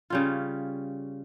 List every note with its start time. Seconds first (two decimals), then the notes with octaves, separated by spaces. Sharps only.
0.10 C#3 G3 C#4 F4